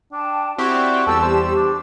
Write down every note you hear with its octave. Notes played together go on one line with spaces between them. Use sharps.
D4 G5 A5
C4 E4 F#4 G4 D5
E2 G3 A4 A5 E6
G4 C5
D4